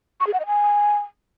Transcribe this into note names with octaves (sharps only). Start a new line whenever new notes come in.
C#6
G#4
F#5
D#5
G#5